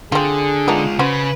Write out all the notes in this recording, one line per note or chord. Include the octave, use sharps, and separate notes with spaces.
D3 C4 F4 G#4
G#3 B3 D4 D#4 F4
C#3 C#4 F#4 B4 C5